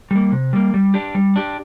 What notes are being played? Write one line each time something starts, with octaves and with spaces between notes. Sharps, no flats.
G3 A#3
C3
G3 A#3
G3
D4 G4
G3
D4 G4